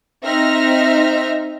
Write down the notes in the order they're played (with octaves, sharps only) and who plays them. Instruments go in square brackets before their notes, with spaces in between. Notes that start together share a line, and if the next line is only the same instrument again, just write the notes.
[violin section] C4 D#4 E5 F6 A#6